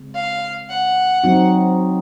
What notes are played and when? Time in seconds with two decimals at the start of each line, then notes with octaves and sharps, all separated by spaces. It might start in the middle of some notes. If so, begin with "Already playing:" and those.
Already playing: C#3 G#3 C4
0.15 F5
0.70 F#5
1.24 F#3 C4 D#4 F#4